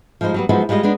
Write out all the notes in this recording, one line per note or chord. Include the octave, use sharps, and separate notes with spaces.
F3 G3 G#3 D#4 C5
F#3 G3 B3
F3 F#3 G#3 B3 D#4 E4
G3 G#3 F4 B4 D#5
G#3 B3 D4 D#4